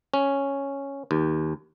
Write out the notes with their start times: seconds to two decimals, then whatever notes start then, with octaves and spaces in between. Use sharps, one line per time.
0.14 C#4
1.11 D#2